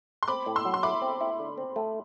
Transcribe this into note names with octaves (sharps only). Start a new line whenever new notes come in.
C6
C4 B5 D6
A2
C6 E6
F#3
C6
E4 B5 D6
C4
E4
D3
C4
A3